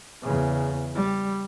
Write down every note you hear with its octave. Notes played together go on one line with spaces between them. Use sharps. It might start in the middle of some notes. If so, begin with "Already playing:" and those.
E2 C#3
G3